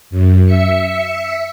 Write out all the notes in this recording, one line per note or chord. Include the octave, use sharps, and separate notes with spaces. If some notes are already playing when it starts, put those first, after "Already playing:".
F#2
E5 C#7